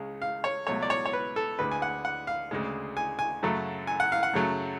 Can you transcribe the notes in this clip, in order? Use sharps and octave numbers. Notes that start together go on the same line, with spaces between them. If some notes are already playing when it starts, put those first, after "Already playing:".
Already playing: C#2 C#3 G#3
F5
C#5
C#2 B2 F#3 A3 C#5
D5
C#5
C#5
B4
A4
D2 D3 G#3 B4
G#5
F#5
F#5
F5
D2 C#3 G#3
G#5
G#5
F#2 C#3 F#3 A3
G#5
F#5
F5
F#5
F#2 C#3 F#3 A3